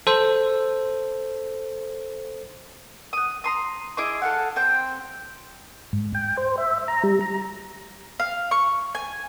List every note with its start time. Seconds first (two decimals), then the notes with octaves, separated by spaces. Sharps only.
0.07 A4 C5
3.13 F#5 D#6
3.44 A#5 C6 D#6
3.97 E4 G#4 D#5 D6
4.22 A4 F5 F#5
4.56 C4 C5 G5
5.93 G#2
6.15 G5
6.37 C5
6.58 E5
6.88 A#5
7.03 G3
7.21 A#5
8.20 F5
8.51 C#6
8.95 G#5